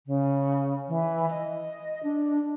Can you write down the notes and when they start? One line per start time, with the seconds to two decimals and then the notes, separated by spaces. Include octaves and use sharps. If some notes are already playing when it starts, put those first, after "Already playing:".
0.07 C#3
0.89 E3
1.30 D#5
2.03 D4